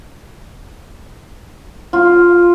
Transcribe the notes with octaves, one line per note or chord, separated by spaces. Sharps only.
F4